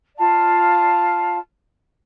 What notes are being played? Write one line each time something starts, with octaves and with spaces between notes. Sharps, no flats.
F4 D5 F5 A5